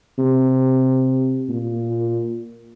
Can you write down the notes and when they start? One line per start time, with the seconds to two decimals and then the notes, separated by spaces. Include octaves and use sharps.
0.18 C3
1.49 A#2